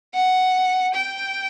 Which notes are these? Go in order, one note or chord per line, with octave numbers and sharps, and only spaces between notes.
F#5
G5